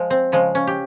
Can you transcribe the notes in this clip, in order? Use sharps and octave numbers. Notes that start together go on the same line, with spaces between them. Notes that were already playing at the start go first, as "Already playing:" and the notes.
Already playing: F3 G#3
C4
C#3 F3 G#3
C#4
G4